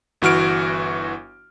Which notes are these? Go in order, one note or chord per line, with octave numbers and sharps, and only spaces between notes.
G1 E3 F#4 F6 D7